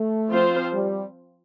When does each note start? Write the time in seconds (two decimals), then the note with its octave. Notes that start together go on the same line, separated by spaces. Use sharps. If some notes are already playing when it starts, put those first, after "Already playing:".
Already playing: A3
0.30 F3 C4 F4 C5
0.73 G3